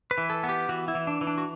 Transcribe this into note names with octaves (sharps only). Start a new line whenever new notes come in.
B4
E3
A4
B3
G4
E3 F#4
E4
E3
D4
E3
D4
F#4